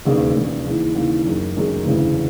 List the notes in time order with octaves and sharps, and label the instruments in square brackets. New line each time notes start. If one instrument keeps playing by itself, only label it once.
[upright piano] E1 D#2 C#3
E1 D#2 C#3
D#2 C#3 E3
D#2 C#3 E3
F#1 F#2 D#3 G#3
F#1 F#2 D#3 G#3
E1 D2 C#3 E3